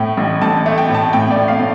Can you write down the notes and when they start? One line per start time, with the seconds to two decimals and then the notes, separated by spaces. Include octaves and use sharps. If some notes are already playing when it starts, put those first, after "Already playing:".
Already playing: A2 A3 G5
0.17 A1
0.41 A1 A5
0.66 A3
0.78 G5
0.88 A2
0.94 A5
1.13 A2 G5
1.31 D5
1.36 A2
1.48 F5
1.60 A2